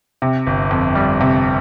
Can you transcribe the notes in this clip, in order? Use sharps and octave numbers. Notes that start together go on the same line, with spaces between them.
C3
G1
F2
G3
C3